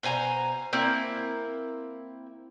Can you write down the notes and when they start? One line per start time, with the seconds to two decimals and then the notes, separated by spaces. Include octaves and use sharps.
0.03 B2 C5 G#5 A#5
0.73 A#3 C4 E4